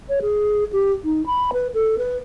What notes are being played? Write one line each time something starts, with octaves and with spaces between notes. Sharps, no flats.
C#5
G#4
G4
D#4
B5
B4
A4
B4